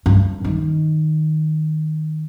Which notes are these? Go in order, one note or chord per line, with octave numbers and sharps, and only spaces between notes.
G2
D#3